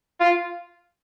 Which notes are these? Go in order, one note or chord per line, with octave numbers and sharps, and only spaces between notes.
F4